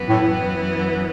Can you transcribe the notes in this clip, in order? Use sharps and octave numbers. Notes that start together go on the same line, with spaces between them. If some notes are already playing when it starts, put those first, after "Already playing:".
Already playing: F#2 E3 B3
A2